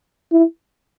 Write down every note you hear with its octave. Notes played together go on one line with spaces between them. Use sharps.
E4